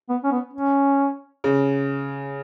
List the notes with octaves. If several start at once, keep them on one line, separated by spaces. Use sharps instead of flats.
B3
C#4
B3
C#4
C#3